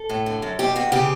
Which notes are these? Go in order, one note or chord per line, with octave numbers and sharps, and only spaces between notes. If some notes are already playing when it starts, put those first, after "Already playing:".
Already playing: A4
A2
D3
F#2
B2 G4
E2 F#4
C#3 G4